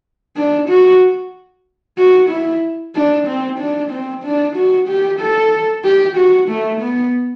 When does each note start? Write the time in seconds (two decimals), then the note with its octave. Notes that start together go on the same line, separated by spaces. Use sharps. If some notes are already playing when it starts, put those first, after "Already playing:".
0.37 D4
0.69 F#4
1.98 F#4
2.30 E4
2.95 D4
3.27 C4
3.59 D4
3.91 C4
4.24 D4
4.56 F#4
4.88 G4
5.20 A4
5.84 G4
6.16 F#4
6.49 A3
6.81 B3